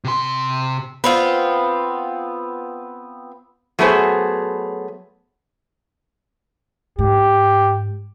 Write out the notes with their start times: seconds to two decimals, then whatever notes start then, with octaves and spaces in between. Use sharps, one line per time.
0.04 C3 C6
1.04 B3 C4 F4
3.79 F#3 A3 B3 G#4 C5
6.99 G#2 G4